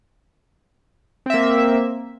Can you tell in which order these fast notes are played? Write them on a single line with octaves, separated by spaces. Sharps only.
C4 E5 A#3